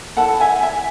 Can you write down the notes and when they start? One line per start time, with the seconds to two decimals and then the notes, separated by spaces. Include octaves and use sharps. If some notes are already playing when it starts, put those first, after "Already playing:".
0.17 E4 A4 F#5 A5
0.40 E5 G#5
0.63 E5 G#5